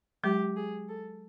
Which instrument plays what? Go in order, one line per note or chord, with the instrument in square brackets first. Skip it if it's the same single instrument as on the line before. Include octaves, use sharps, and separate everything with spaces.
[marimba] F#3 G#3 [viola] G4
[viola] G#4
A4